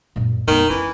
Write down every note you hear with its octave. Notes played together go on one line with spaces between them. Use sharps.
F#2 A#2
F2 D#3 B3
E3 C#4